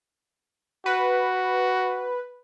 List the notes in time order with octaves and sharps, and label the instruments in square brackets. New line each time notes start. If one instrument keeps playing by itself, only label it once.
[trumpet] F#4 [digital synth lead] B4